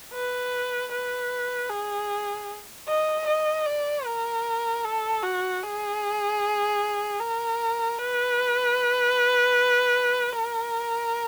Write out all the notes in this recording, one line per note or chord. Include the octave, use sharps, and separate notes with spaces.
B4
B4
G#4
D#5
D#5
D5
A#4
A4
F#4
G#4
A#4
B4
A#4